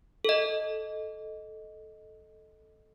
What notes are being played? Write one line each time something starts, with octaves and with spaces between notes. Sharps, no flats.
A4 D#5